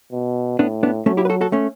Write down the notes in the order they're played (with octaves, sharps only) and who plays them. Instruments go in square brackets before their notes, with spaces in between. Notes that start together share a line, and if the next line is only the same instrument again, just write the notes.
[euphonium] B2
[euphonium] A2 [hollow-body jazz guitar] B3 D4
[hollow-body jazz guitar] B3 D4
[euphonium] F#3 [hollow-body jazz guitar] A3 C#4
[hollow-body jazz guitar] E4 G4
B4
F#4 A4
F#4 A4
A3 C#4